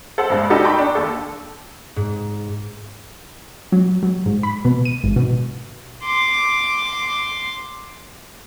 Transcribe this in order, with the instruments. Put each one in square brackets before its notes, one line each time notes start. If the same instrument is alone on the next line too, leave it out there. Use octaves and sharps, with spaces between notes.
[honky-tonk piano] A4 C5 F#5
C#2 G2
D4 D#4 F#4 G4 A4 A#4
G5 A#5 B5 C#6 D#6 G6
D4
D#2 A4
[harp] G#2
[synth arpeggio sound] F#3
F#3
G#2
B5
B2
D#7
G#1
B2
[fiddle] C6 D6